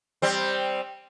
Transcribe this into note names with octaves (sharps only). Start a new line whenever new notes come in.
G3 C4